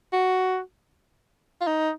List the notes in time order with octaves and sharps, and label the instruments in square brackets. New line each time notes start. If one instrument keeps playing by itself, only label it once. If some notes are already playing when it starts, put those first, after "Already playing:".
[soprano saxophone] F#4
F4
D#4